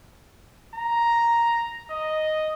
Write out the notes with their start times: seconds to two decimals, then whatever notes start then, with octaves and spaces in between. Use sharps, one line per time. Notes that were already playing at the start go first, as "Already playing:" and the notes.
0.75 A#5
1.91 D#5